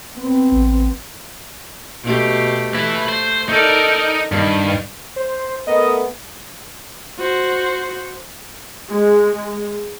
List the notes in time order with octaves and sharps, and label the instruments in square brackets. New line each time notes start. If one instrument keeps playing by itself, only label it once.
[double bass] B3 C4
[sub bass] A1
[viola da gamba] B2 A3 G4
[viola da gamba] A3 [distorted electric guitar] B4 E5
[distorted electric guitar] C5
[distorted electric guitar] D#4 [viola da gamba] A4 A#4 D5
[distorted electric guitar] G2 [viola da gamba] D#3
[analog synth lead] C5
[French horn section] A3 B3 A#4 [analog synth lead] D#5
[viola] F#4 C5
[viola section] G#3